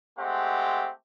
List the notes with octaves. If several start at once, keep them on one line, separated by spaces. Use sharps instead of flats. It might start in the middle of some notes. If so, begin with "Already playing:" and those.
G#3 A3 C4 G4 F#5